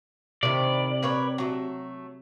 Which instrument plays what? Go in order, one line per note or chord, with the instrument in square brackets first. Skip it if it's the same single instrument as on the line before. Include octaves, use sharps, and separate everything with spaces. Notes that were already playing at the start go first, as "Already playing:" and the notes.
[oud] C3 [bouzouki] D#3 E4 [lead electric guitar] D5
[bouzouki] A#4 B4 C#5
F#3 A3